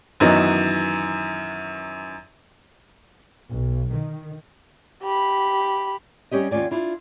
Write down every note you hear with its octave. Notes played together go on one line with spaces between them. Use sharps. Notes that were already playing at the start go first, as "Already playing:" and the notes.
F#2 D#3 E3 F#3 B3 D#4
B1
D#3
G4 B5
G3 C#4 G4 D#5
D#2 C#4 F4 D5 G#5
D4 E4 F4